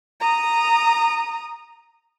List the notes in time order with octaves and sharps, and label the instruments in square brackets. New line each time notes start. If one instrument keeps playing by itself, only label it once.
[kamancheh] A#5 D#6